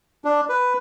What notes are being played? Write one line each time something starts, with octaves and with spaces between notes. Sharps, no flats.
D4
B4